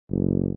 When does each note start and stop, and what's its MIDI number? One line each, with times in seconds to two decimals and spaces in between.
0.11 0.51 30